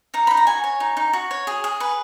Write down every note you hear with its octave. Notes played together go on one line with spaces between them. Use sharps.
D#4 A#5
D#4 B5
A#5
F#4 G#5
C#5
D#4
D#4
F#4
C#5
G#4
G#4
B4